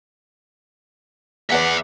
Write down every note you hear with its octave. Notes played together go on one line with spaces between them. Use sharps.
E2 B3 D5 E5 F#5